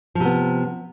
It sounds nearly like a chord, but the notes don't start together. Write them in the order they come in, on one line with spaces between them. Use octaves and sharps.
F3 C3 B3